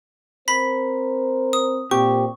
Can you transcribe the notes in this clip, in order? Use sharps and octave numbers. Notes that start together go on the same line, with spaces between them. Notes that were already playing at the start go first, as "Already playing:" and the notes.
C4 A#4 C5 B5 B6
D#6
A#2 C4 G4 C#6